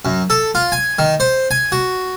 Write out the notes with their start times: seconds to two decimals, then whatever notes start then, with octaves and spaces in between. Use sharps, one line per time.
0.05 F#2
0.30 A4
0.55 F4
0.72 G#5
0.99 D#3
1.20 C5
1.51 G#5
1.72 F#4